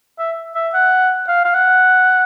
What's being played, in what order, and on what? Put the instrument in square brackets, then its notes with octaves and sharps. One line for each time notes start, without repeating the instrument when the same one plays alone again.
[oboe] E5
E5
F#5
F5
F5
F#5